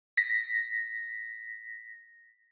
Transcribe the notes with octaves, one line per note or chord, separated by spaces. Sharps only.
A#6 B6